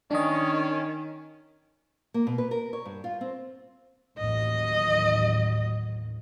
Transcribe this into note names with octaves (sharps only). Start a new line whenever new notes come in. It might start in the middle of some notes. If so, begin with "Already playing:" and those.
D#3 C#4 D4 D#5
A#3
B2
B4
A#4
C#5
G2
F4
C4
A1 D#2 F#3 D#5